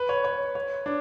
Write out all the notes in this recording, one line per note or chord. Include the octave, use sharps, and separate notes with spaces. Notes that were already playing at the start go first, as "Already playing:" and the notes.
Already playing: B4
C#5
C#5
C#5
D4